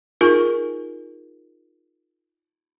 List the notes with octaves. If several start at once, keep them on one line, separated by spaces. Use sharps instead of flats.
D#4 F4 G#4 A#4 G#5 C#6